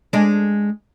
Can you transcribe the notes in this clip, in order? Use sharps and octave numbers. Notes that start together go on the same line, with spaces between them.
G#3 D4